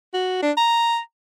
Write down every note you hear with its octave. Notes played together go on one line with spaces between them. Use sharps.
F#4
D4
A#5